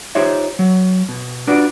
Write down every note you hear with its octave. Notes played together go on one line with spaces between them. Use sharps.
D#4 F4 G4 C5 C#5 E5
F#3
B2
D4 F4 F#4 B4 D5